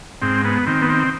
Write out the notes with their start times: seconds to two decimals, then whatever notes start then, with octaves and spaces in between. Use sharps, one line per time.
0.22 G#2 C4
0.45 B3
0.66 D#3 C4
0.82 B3
0.90 C4